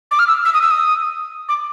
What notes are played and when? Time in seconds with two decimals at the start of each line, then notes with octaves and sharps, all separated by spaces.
0.11 D6
0.19 F6
0.28 E6
0.45 E6
0.54 D#6
0.62 E6
0.71 D#6
1.49 D6